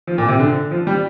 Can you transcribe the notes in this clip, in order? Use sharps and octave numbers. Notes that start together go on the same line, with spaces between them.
F3
A#2
C3
D3
F3
G3